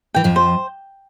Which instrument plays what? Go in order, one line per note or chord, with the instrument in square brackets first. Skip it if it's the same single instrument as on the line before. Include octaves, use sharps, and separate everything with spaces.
[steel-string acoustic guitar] E3 [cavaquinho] G5
[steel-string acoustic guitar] F2 F3
[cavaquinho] C5